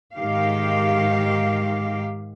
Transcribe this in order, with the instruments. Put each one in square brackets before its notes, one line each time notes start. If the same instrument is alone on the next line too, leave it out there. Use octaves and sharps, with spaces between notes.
[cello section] G#2 D#3 G4 F5